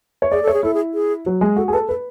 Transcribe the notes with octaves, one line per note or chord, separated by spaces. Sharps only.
C#5
G#4 D5
A4 C#5
G#4
E4 A4
G#4
G#4
F#3
G#3
F#4 A4
G#4
A4 B4
A4 B4